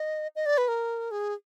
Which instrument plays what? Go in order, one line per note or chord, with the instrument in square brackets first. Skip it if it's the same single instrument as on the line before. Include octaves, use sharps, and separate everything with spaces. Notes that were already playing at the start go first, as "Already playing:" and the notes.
Already playing: [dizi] D#5
D#5
D5
B4
A#4
G#4